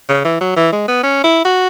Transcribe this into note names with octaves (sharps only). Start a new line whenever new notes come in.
C#3
E3
F#3
E3
G#3
B3
C#4
E4
F#4